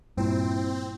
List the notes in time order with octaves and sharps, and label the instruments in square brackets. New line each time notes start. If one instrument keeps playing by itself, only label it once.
[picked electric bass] G2 A#2 [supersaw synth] C4 [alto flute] E4